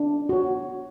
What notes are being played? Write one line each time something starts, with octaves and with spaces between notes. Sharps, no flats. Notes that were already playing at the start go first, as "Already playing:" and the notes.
Already playing: D4
F#4 C#5